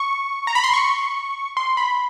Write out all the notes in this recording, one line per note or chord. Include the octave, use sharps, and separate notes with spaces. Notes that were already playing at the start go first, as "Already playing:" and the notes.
Already playing: C#6
A#5
B5
C6
C#6
C6
B5